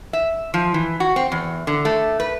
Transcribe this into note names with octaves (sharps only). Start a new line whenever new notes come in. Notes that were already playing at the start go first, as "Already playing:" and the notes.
E5
F3
E3
F#4
C4
E2
D3
A3
B4